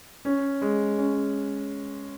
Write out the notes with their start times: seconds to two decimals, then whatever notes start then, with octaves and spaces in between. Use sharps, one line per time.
0.25 C#4
0.62 G#3
0.98 C#4